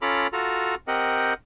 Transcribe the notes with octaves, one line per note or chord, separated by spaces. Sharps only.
C#4 F4 A4 A#5 B5 D6
F4 F#4 A4 A#5
C4 G4 A#4 D#5 F#5